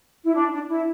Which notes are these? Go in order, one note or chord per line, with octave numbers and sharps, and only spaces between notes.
E4
D4
D4
E4